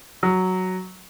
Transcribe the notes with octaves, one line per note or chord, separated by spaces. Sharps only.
F#3